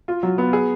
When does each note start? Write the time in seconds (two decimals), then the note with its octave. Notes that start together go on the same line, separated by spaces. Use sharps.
0.08 F4
0.23 F#3
0.38 B3
0.53 G#4